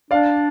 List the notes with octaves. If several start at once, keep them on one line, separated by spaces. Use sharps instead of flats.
D4 D5 F5